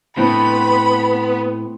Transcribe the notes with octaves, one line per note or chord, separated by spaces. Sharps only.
A2 B3 C4 B5